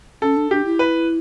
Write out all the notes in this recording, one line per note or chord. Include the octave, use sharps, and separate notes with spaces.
C#4 A4
D4
D4 G4
E4
B4